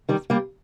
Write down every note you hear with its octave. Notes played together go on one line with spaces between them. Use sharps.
D#3 G3
G3 A#3